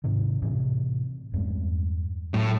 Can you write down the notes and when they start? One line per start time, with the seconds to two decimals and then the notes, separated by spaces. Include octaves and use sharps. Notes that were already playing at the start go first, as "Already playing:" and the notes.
0.04 G#2 C3 D#3
0.42 A2 C3 E3
1.33 E2 G2 G#3
2.34 A2 F#3